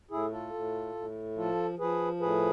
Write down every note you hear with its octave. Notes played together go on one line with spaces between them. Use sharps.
A2 E4 G#4
F4 A4
A2
A2
F3 F4 A4
F3 G#4 B4
A2 G#4 B4